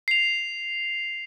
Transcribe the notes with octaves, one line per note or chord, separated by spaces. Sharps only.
C7 F7